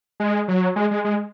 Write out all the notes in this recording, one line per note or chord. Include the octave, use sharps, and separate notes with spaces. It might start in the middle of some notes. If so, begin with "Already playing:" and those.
G#3
F#3
G#3
G#3
G#3